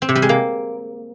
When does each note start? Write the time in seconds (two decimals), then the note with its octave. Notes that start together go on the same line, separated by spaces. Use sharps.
0.02 C4
0.09 C3
0.15 G3
0.22 G#3
0.29 A#3